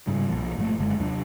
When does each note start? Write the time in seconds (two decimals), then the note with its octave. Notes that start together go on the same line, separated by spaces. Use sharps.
0.07 G#2 C#3 G3
0.29 B1 A#2 F3
0.57 G1 A2 F3 A3
0.79 F#1 F#2 D3 G#3
1.00 D#2 C3 F#3 D4